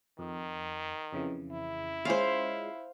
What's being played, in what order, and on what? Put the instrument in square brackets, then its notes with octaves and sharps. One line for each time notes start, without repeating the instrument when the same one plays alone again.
[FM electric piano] F2 [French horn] D#3
[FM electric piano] F2 C#3 E3
[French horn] E4
[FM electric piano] G#3 C#4 F4 [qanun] C5 F5